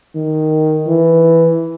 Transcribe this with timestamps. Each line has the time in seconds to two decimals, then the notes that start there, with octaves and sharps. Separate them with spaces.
0.16 D#3
0.87 E3